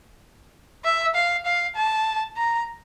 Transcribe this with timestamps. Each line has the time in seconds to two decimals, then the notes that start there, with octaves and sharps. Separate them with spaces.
0.84 E5
1.15 F5
1.45 F5
1.76 A5
2.37 A#5